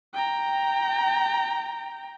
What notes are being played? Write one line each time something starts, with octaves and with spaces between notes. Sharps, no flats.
G5 A#5